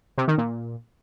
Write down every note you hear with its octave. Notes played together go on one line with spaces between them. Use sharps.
C3
D#3
A#2